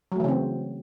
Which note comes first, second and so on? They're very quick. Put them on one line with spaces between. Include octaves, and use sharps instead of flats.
F#3 A3 E3 C#3 C4